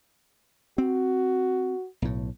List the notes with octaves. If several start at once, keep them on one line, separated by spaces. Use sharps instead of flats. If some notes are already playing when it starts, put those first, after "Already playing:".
C4 F#4
B1 A2